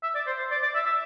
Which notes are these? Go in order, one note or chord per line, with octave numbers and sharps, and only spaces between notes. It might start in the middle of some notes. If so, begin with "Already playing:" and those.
E5
D5
C5
C5
D5
D5
E5
E5